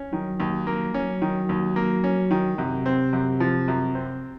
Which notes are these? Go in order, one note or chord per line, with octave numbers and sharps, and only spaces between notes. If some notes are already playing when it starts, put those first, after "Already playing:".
Already playing: C#4
D#3 F#3
D#2
A#3
F#3 C#4
D#3
D#2
A#3
C#4
D#3
F#2 C3
C4
F#2
F3
F#2
C4